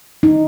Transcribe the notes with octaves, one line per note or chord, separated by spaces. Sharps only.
D#4